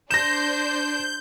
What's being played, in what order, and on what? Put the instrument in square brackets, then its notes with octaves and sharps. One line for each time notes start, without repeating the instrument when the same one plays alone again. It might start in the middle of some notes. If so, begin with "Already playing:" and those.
[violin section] D4 C5 [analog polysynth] G6 [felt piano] A#6 E7